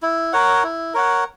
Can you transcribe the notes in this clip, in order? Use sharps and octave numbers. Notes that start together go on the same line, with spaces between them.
E4
A#4 C#5 F#5
E4
A#4 C#5 F#5